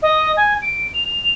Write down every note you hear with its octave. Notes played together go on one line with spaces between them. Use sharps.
D#5
G#5
D7
F7